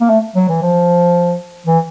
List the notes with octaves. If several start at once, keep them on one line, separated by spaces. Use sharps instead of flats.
A#3
A3
F#3
E3
F3
E3